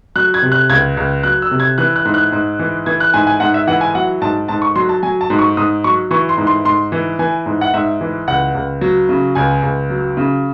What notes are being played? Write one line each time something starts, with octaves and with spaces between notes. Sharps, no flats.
F#3 F#6
G#6
C3
F#6
C#2 G#6
C#2
F#3 F#6
E6
C3
G#6
E3 F#6
F#6
G#2
F#6
G#2
E3
E3 G#6
F#6
G#2 G#5
G#5
G#2 F#5
E5
E3 F#5
G#5
F#3 F#5
G#2 A5
G#2 A5
C#6
F#3 C6
A5
F#3 G#5
A5
G#2
C#6
G#2 D#6
F#3 C#6
E3 C#6
C6
G#2
C6
G#2 C6
E3
E3 G#5
G#2
F#5
G#2 E5
E3
C#2 F#5
C#2
F#3
C#3
C#2 G#5
C#2
F#3
C#3